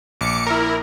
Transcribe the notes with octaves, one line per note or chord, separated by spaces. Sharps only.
A#1 D6 C#7
E4 A#4